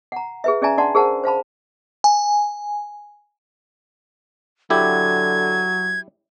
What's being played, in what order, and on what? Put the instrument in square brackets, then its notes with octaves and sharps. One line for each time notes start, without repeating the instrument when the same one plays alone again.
[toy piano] F#5 A#5
G#4 B4 E5
C#4 G#4 D5 E5 G#5 A#5
D4 D5 F#5 A5 C6
G#4 A#4 C5 F#5 A5
C5 F5 A5 B5
[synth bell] G#5
[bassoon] D3 [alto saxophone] F#3 [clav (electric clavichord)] E4 G4 [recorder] G#6